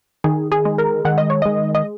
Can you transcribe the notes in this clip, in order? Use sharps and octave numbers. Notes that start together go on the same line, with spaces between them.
D#3 G#4
G#4
G#3
A#4
D#3 F#5
D#5
C#5
G#3 D#5
D#5